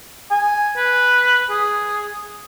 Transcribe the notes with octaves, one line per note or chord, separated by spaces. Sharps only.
G#5
B4
G#4